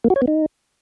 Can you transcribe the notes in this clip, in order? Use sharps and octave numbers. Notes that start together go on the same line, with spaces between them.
A#3
F#4
C#5
B3
D#4